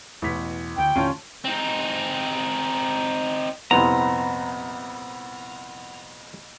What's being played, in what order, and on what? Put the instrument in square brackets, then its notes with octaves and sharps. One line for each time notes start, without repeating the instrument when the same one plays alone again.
[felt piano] A1 B6 [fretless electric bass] E2 B2
[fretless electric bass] D2 [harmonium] G5
[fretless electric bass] D#2 A2 D3 [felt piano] C#4 F4 A5
[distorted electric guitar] C4 D#4
[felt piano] C2 F2 A#2 [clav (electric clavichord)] B3 C4 [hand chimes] F#5 B5 [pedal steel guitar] A#5